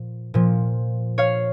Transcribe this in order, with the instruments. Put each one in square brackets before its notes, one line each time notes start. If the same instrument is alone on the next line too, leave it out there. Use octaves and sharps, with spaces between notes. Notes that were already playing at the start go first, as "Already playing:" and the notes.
Already playing: [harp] A#2 F3
A#2 F3
C#5 F5